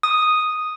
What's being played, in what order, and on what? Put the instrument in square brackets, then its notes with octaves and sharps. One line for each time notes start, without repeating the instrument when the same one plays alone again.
[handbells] D#6